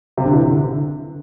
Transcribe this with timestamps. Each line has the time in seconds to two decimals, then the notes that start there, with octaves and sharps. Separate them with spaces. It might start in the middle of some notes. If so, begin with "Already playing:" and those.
0.17 C3
0.25 D3
0.33 C3 E3
0.51 D3